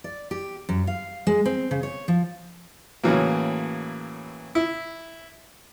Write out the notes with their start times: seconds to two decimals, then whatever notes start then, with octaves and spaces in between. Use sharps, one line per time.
0.04 D5
0.31 G4
0.69 F#2
0.87 F5
1.27 G#3
1.45 C4
1.71 C#3
1.83 C#5
2.08 F3
3.03 A2 C#3 E3 F#3 A#3
4.55 E4